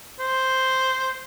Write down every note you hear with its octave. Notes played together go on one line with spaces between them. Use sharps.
C5